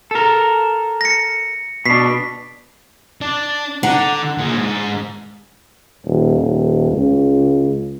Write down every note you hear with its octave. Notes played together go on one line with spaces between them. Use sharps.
A4 A#4
A#6 C#7
B2 D4 B6 C7
D4 D5
D3 D4 F#5 A#5
A#2 G#4
G#2
D#1
D#1
C#2